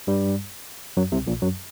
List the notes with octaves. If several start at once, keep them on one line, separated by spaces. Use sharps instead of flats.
G2 G3
F#2 F#3
C2 C3
A#1 A#2
F#2 F#3